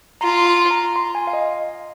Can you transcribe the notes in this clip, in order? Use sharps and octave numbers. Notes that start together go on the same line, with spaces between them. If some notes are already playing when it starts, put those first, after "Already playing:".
F4 A#5
C6
A#5
C6
G#5
F5
D#5